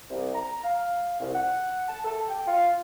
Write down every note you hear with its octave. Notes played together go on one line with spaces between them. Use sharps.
C2
A#5
F5
C2
F#5
A5
A4
G5
F4